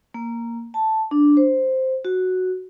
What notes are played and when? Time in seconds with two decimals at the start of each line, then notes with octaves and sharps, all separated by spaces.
0.14 A#3
0.74 A5
1.11 D4
1.37 C5
2.05 F#4